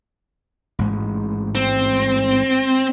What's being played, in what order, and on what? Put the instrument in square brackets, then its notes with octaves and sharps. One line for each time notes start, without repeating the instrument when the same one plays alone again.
[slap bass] A1 G#2 G#3
[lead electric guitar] C4